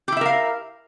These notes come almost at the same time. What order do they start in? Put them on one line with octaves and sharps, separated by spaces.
G4 E4 E5 A#4 F5